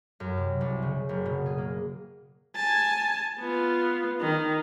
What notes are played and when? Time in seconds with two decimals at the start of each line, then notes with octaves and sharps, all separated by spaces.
0.20 F#2
0.37 C3
0.61 C2
0.82 C#3
1.09 F#1
1.26 B2
1.46 G#4
1.58 A#3
2.55 G#5 A5
3.40 B3 F4
4.20 D#3